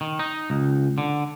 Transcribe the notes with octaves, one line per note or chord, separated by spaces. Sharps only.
D#3
D#4
C#2
D3